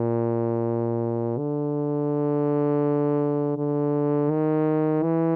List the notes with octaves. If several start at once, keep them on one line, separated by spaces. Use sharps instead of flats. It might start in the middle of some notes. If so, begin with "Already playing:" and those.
Already playing: A#2
D3
D3
D#3
E3